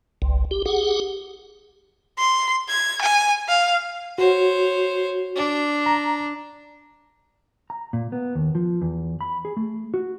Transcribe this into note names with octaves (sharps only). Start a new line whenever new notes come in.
G1 C2
G4
G4 G#4 F#5
C6
G#6
G#5
F5
F#4 C5 C#5
D4
A#5
A#5
A#2
B3
D#2
F3
E2
B5
G#4
A3
F#4